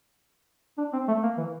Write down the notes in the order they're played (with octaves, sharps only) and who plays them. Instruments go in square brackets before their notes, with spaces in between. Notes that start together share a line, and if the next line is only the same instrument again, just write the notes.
[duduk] D4
C4
A3
A#3
E3